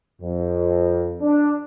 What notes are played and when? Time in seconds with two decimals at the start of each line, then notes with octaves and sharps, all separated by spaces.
0.20 F2
1.20 D4